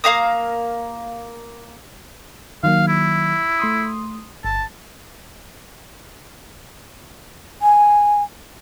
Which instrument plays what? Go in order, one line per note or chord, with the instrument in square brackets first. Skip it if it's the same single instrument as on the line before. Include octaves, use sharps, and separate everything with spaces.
[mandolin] A#3 F5 A#5 D#6
[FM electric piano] D#3 F#3 A#3 [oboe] F5
[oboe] E4
[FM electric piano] A3 C6 D#6
[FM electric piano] G1 [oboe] A5
[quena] G#5